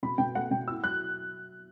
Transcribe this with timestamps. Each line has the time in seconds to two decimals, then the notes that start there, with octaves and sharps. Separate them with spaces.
0.03 B2 B5
0.18 B2 G5
0.35 A3 F#5
0.51 B2 G5
0.68 E4 E6
0.84 F#3 F#6